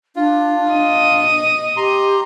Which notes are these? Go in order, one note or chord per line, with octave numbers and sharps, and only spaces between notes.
D4 F4
D4 D#5
G4 A#5 C6